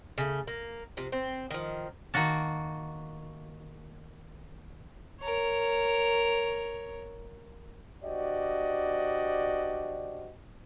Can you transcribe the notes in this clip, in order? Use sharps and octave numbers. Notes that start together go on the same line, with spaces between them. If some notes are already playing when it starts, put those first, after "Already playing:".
C#3 A3
A#3
C3 F3
C4
D#3 F3
D#3 A#3 F#4 A5
A#4 C#5
D4 F#4 G4 C5 D5 D#5